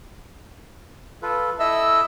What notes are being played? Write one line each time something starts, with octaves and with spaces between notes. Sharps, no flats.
F4 A4 B4
E4 A4 D#5 E5